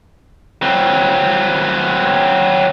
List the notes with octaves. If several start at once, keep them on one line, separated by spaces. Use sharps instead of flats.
F#3 C4